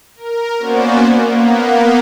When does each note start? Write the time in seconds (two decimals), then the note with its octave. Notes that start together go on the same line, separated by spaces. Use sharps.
0.15 A#4
0.58 A#3 B3 C#4 F#4 C5 D5
1.19 A#3 B3